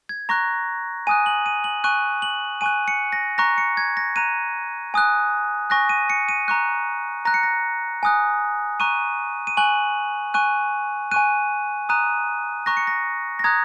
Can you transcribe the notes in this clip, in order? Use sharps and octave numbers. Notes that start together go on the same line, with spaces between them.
G#6
A#5 C#6 F#6 A#6
G#5 D#6 F#6 D#7
F#7
D#7
F#7
G#5 C#6 F#6 D#7
F#7
G#5 C#6 F#6 D#7
C#7
A#6
A#5 C#6 F#6 A#6
C#7
G#6
A#6
A#5 F#6 D#7
G#5 D#6 F#6
G#5 C#6 F#6 A#6
D#7
C#7
D#7
A#5 C#6 F#6
A#5 F#6 A#6
C#7
A#6
G#5 D#6 F#6
A#5 C#6 F#6 D#7
D#7
G#5 C#6 F#6 F#7
G#5 C#6 F#6 D#7
G#5 C#6 F#6 D#7
A#5 D#6 F#6 D#7
A#5 C#6 F#6 A#6
C#7
A#6
A#6
A#5 D#6 F#6 G#6